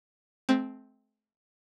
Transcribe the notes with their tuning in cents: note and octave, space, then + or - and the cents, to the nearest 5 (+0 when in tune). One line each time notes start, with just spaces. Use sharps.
A3 -40 C4 +0